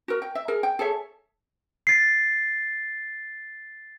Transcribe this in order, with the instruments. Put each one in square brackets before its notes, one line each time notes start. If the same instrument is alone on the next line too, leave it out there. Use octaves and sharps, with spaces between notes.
[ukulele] F#4 A#4
G5
E5
G#4 A#4
G5
G#4 A4 C#5 E5
[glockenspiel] A6 C7